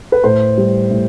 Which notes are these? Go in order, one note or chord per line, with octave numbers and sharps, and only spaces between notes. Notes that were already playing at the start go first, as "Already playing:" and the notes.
B4
A2 C5
G3
A2